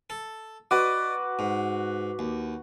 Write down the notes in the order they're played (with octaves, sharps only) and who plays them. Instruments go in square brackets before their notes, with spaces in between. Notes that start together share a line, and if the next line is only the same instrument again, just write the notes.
[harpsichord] A4
[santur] F#4 B4 [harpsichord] D5 D#5 [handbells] D6
[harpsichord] G#2
D#2